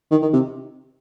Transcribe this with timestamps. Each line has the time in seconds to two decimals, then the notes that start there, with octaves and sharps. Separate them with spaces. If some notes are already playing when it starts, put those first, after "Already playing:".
0.11 D#3
0.22 D#3
0.33 C3